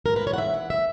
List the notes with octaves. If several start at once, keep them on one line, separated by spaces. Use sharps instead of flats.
G#2 A#4
B4
E3
C#5
F#5
G#2 E5
E3 F#5
E5